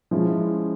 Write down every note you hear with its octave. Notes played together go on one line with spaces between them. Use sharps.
F3 G#3 C#4 E4